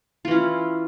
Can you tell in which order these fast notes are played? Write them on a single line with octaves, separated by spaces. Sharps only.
F4 E3 C#4